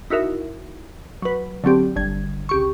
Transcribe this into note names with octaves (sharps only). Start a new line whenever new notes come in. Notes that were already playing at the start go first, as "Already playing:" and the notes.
D#4 E4 F#4 A#4 E5
F#3 B4
D3 F#3 C4 G4
G1 D3 G#6
C#2 G4 C#6